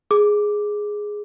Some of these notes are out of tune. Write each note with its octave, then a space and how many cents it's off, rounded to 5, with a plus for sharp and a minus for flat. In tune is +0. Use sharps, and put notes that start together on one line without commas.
G#4 +0 D6 +0